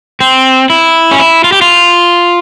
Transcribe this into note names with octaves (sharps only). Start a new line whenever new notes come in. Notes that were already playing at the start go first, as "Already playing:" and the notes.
C4
E4
C#4
E4
F4
G4
F4